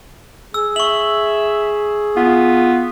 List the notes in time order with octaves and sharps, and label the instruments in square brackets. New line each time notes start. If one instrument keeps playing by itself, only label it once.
[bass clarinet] G#4 [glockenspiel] E6
[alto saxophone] E5 [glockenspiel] C#6 F#7
[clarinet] B3 [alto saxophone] F4